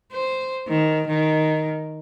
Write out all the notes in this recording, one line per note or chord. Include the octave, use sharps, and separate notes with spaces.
C5
D#3
D#3